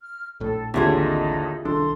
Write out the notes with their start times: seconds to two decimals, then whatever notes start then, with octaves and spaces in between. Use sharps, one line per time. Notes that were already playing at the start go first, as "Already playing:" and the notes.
0.01 F6
0.40 A#1 A2 A4
0.74 A1 D#2 D3 C4 E4 F4 G#4 C#5
0.92 D#4
1.65 C2 D#3 D4 A4 C6